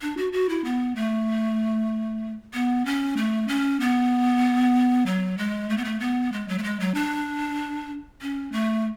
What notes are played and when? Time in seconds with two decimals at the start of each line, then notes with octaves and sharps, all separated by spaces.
0.02 D4
0.17 F#4
0.33 F#4
0.49 E4
0.65 B3
0.96 A3
2.54 B3
2.85 C#4
3.17 A3
3.48 C#4
3.80 B3
5.06 F#3
5.38 G#3
5.70 A3
5.77 B3
5.85 A3
6.00 B3
6.33 G#3
6.48 F#3
6.58 A3
6.63 G#3
6.80 F#3
6.94 D4
8.22 C#4
8.52 A3